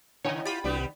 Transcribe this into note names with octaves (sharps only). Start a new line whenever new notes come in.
C#3 E4 C#5 D#5 F#5 G#5
F4 G4 B5 A6
C2 G3 B3 D4 F#4 G4
D#3